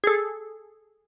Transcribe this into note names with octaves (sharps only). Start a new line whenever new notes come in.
G#4 A4